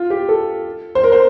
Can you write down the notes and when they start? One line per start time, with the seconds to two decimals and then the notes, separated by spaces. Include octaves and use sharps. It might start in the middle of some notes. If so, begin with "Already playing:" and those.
Already playing: F4
0.10 G4
0.29 A4
0.95 C5
1.04 A#4
1.12 C5